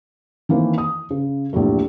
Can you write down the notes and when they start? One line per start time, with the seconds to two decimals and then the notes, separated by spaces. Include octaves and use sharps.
0.49 D#3 E3 A#3 C4
0.78 D#6
1.10 C#3
1.53 A#1 E2 G3 A3